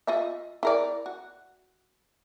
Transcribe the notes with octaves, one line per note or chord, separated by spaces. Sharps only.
F4 D#5 E5
E4 A#4 D5
F#4